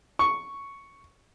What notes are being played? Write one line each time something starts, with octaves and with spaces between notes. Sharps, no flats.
C#6